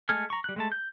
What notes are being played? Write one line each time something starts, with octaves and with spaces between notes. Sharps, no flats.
G#3 A3 A4 G#5 F6
A#5 C#6
G3 F#6
G#3 A3 A5
G6